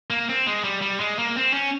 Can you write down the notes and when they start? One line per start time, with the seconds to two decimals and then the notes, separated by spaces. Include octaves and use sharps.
0.10 A#3
0.29 C4
0.47 G#3
0.64 G3
0.82 G3
1.00 G#3
1.19 A#3
1.36 C4
1.53 C#4